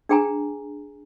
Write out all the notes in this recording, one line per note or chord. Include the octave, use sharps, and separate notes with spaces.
D4 G#4 G5 G#5 A#5